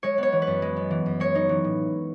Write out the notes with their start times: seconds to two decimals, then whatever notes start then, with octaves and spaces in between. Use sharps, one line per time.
0.03 G#3 C#5
0.18 B3 C#5
0.33 E3
0.42 B4
0.47 F#2
0.62 G#3
0.76 B3
0.91 E3
1.06 F#2
1.20 G#3 C#5
1.35 D#4
1.49 E3
1.64 A2